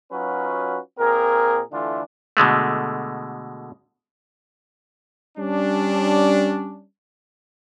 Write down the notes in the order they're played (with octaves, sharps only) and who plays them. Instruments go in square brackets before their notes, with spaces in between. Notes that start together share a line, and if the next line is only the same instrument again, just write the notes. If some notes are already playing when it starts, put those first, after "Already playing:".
[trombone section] F#3 C#4 D#4 F4 F#4 B4
A#2 C4 G#4 A#4
D3 E3 A3 D4 E4 F4
[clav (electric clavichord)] B2 D3 G#3 A3
[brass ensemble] G3 C#4 D4